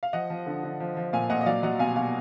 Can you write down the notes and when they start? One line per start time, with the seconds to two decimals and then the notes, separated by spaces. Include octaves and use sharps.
0.03 F5
0.13 F3 D#5 F#5
0.30 F3
0.46 D3
0.63 D3
0.80 F3
0.97 F3
1.13 A#2 F5 G#5
1.30 A#2 D#5 F#5
1.41 D#5
1.46 F#3 D5 F5
1.63 F#3 D#5 F#5
1.79 B2 F5 G#5
1.96 B2 F5 G#5